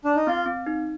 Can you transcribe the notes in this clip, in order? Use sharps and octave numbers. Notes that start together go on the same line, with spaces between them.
D4
D#4
C4 F4
C4
D#4